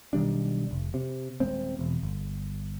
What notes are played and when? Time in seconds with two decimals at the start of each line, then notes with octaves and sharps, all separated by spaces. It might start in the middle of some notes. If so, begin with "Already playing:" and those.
0.13 B1 D#3 G3 D4
0.71 F1
0.94 C3
1.40 D#1 G#3 C4
1.79 E1
2.03 G1